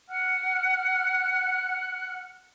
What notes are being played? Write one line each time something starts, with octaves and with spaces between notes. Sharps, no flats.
F#5 F6 F#6